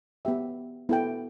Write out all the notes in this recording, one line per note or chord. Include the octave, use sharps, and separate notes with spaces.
B3 G4 E5 G5
B3 E4 A4 G5